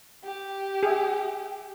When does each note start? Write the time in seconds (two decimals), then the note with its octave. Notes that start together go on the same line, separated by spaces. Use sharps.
0.23 G4
0.83 G#4 E5